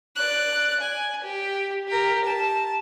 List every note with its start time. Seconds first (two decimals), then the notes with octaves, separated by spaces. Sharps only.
0.16 D5 F#6
0.80 G#5
1.23 G4
1.88 G4 A#4
2.24 A5